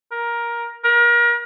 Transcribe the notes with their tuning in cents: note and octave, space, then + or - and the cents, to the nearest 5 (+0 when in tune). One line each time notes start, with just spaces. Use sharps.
A#4 +15
A#4 +35